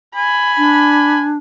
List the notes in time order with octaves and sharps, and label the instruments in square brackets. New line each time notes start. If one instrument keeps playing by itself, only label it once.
[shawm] G#5 [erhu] B5
[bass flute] D4